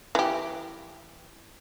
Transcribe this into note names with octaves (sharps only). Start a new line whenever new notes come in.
E3 G4